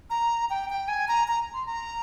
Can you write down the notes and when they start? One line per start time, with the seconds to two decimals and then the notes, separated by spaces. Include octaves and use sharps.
0.10 A#5
0.50 G5
0.70 G5
0.88 G#5
1.08 A#5
1.28 A#5
1.54 C6
1.66 A#5